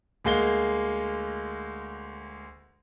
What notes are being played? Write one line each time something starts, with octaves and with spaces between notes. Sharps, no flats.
D2 G#3 A#3 G7